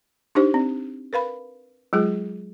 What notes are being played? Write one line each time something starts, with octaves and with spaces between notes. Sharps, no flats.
D4 D#4 G4 C5
C4
A#4 B4 F5 B5
F#3 G#3 F4 G#4